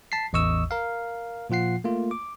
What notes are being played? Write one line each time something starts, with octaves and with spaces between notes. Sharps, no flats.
A5 B6 C7
A1 E2 D#5 C#6 D#6 E6
A#4 F5
A#2 F3 F4 F#5 C7
A3 A#3 F4
D6